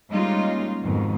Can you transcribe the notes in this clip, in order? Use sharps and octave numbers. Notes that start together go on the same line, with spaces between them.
G3 G#3 A#3 C#4 D#4 F4
F2 G#2 B2 D#3